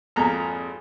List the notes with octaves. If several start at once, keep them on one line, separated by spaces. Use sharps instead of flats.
G#1 F2 A#3 A#5